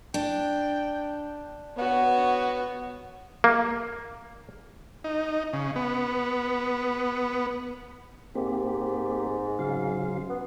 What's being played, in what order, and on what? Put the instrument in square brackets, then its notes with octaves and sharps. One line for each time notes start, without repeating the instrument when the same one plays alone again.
[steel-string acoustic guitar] D4 [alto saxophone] G5
[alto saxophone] B3 [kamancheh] F#4 C#5
[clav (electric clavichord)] A#3
[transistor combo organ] D#4
C#3
B3
[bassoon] G#2 [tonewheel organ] A#3 C4 G4
[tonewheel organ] C#3 F#3 F5
[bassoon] B3